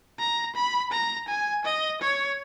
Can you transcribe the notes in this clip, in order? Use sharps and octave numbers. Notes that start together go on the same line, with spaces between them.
A#5
B5
A#5
G#5
D#5
C#5